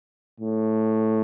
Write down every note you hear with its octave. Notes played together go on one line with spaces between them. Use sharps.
A2